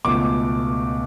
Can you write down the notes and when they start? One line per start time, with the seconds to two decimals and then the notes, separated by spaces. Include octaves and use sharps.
0.05 C#2 B2 A3 D6